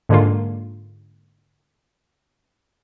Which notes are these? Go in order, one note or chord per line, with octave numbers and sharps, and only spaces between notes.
G#2 D3 G#3 A#3 F4